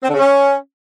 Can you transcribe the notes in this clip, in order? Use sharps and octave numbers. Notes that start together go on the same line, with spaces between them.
C4
D3
C#3
C#4